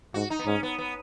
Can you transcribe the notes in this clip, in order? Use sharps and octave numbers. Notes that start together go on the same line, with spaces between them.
G#2 F#4
D#4
B3
G#2 C#4
B3
B3